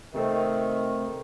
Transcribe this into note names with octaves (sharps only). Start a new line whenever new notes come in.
C3 D#3 A3 C4